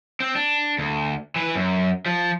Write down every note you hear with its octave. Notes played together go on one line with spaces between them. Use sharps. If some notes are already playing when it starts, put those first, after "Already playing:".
C4
D4
D2
E3 B4
F#2
F3